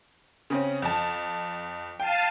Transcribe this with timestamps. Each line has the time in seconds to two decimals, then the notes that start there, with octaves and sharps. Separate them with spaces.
0.50 C#3 C4 C#4
0.82 F2 A5
2.00 F5 G5 A5 D#7